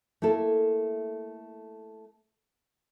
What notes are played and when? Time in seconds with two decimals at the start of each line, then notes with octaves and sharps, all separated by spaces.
0.22 A3 A#3 E4 A4